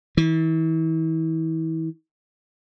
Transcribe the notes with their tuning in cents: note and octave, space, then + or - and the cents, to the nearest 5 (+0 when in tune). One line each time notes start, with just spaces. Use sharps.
E3 -35